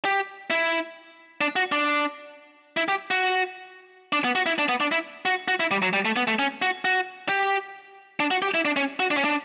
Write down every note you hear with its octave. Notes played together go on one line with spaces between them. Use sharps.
G4
E4
D4
F#4
D4
E4
G4
F#4
D4
B3
F#4
E4
D4
B3
D4
E4
F#4
F#4
E4
G3
F#3
G3
A3
B3
A3
C#4
F#4
F#4
G4
D4
F#4
G4
E4
D4
C#4
F#4
D4
C#4
D4